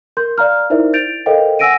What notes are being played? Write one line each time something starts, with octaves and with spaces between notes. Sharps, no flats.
A#4 C6 G6
D5 F5 A#5 F6
D#4 E4 A#4 C5 D5 E5
G6 A6 D7 F7
A4 A#4 C5 D#5 F5 G5
F#5 G#5 E6 A#6 D7 D#7